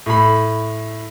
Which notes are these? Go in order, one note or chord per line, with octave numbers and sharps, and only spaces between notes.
A2 B5